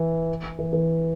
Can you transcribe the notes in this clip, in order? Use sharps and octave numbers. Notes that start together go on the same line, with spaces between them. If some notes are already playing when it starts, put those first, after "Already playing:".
Already playing: E3
E3
E3